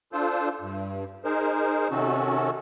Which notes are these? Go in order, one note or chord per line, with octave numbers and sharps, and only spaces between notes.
D4 F4 A4 C5
G2
D#4 G#4 A#4 C5
C3 D#3 C#4 F#4 A4